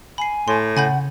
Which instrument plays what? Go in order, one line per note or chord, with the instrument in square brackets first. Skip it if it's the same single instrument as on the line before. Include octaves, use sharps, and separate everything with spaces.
[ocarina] G#5 [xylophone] B5 C7
[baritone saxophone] A2 [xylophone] C6
[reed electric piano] C#3 [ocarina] F#5 [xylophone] G#5 B5 G6